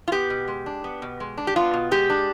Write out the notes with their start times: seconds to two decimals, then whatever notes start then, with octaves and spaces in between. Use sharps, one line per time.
0.08 F4
0.12 B3 G4
0.30 B2
0.48 G#3
0.66 D4
0.84 B3
1.02 B2
1.20 G#3
1.37 D4
1.47 G4
1.56 B3 F4
1.74 B2
1.91 G#3 G4
2.10 D4